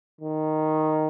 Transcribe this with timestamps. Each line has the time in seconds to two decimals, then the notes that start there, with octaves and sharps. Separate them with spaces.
0.21 D#3